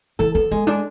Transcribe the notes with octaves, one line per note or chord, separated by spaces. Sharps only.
E3 A4
B3 A4
G#3 B3
G#3 D4